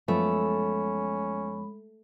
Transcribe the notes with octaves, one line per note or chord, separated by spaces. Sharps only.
F#2 F3 G#3 A3 B3 C#4 B5